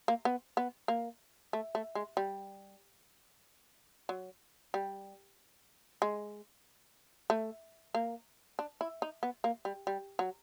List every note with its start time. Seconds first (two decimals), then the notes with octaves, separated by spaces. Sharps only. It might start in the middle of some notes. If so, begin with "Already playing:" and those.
0.08 A#3
0.25 B3
0.57 B3
0.88 A#3
1.53 A3
1.75 A3
1.95 G#3
2.17 G3
4.09 F#3
4.74 G3
6.02 G#3
7.30 A3
7.94 A#3
8.59 D4
8.81 E4
9.02 D#4
9.23 B3
9.44 A#3
9.65 G3
9.87 G3
10.19 F#3